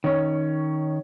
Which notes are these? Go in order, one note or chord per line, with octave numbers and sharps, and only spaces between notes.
D#3 C#4 C#5